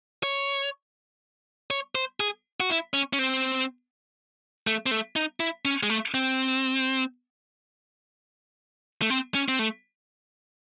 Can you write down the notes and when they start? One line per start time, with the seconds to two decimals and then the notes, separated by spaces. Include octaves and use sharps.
0.23 C#5
1.71 C#5
1.95 C5
2.20 G#4
2.60 F#4
2.70 E4
2.94 C#4
3.13 C#4
3.19 C4
4.67 A3
4.86 C4
4.91 A3
5.16 D#4
5.40 E4
5.65 C#4
5.83 G#3
5.90 A3
6.14 C4
9.02 A3
9.10 C4
9.35 C#4
9.48 C4
9.59 A3